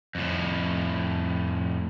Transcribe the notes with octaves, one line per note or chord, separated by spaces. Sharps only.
F2 A2